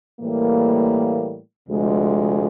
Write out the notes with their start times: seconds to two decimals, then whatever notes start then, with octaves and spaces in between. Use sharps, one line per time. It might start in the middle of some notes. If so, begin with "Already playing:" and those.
0.20 A2 E3 G3 A#3
1.67 D2 C3 F3 G#3